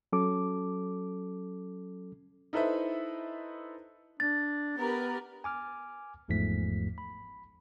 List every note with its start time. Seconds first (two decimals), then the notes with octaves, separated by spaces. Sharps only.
0.12 F#3 C#4 A4 D6
2.53 D#4 E4 A4 B4 C5 E5
4.20 D4 A6
4.77 B3 G4 A#4 B4
5.44 G#5 D6 F6
6.28 G1 E2 G#2 F3 A3 B6
6.98 B5